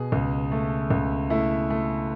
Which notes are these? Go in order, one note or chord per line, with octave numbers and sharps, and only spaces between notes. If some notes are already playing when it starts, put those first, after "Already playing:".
Already playing: B2 G#4
C#2
A3
C#2
A3 E4
A3